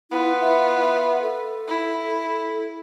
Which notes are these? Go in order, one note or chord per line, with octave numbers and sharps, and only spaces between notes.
B3 E4 F4
E5
E5
A4
E4